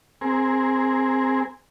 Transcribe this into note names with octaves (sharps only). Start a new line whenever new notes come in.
C4 G#4 A#4